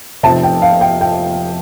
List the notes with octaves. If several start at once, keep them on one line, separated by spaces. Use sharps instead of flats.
F1 F2 C3 A5
G5
F5
G5
G5